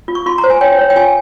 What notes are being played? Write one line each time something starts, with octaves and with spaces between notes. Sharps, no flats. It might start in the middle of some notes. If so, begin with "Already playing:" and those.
F4
C#6
F4 C6
A#5
C5
G#5
C#5 G5
C#5
G5
F4 G#5